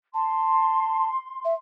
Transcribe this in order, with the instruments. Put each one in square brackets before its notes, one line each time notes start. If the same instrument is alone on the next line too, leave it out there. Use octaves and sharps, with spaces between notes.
[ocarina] A5 [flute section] C6
[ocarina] E5